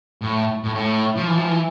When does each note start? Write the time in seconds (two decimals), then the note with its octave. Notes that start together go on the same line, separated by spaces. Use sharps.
0.22 A2
0.63 A2
0.75 A2
1.17 F3
1.27 E3
1.38 F3
1.48 E3